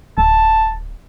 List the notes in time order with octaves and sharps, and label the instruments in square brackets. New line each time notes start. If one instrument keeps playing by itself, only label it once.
[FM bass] D1 [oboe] A5